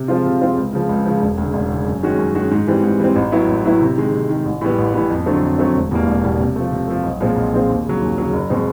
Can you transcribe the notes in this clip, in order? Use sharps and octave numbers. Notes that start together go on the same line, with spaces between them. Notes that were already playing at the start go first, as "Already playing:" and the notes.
Already playing: C3
F3 G#3 C4 F4
C3
F3 G#3 C4 F4
C#2
C#3 F3
C#2
C#3 F3
E1
D2 C#3
E1
D2 C#3
F#2
D#3 G#3 C#4 F#4
F#2
D#3 G#3 C#4 F#4
G#2
E3 G3 C4
G#2
E3 G3 C4
A1
A2 F#3 B3 E4
A1
A2 F#3 B3 E4
C3
D#3 G#3
C3
D#3 G#3
A1
A2 E3 G3 B3
A1
A2 E3 G3 B3
F2
D3 F#3 A3 C4
F2
D3 F#3 A3 C4
E1
E2 B2 G3 A#3
E1
E2 B2 G3 A#3
C3
F3 A3
C3
F3 A3
B1
A#2 F3 G#3 C4
B1
A#2 F3 G#3 C4
D#2
C#3 F#3
D#2
C#3 F#3
F#1
B2 G#3 C4